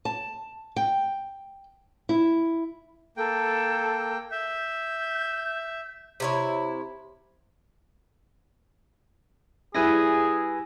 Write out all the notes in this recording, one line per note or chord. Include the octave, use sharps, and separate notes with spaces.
A5
G5
E4
A#3 A4 G5
E5 G6
C3 E4 C#5
G3 E4 G#4 B4 G#5 A#6